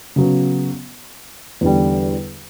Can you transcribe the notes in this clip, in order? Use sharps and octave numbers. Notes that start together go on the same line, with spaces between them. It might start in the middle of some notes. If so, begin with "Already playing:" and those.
C#3 F#3 B3
E2 D3 G3